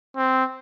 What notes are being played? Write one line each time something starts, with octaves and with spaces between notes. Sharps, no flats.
C4